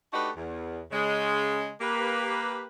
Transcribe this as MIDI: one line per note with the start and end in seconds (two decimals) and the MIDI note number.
0.13 0.30 57
0.13 0.30 62
0.13 0.30 63
0.13 0.30 66
0.13 0.30 67
0.13 0.30 71
0.36 0.82 40
0.91 1.70 49
0.91 1.70 56
1.81 2.67 58
1.81 2.67 67
1.81 2.67 71